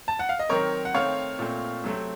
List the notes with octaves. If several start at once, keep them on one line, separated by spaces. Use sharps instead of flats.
A5
F#5
F5
D#5
D#3 F#3 C4 A#4 C#5
F#5
D#3 A3 C4 C#5 F5
A#2 A3 C4
C3 F#3 A3 C4